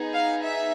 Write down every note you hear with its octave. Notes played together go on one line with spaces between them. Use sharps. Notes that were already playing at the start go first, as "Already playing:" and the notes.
Already playing: B3 D#4 G#4
F5
E5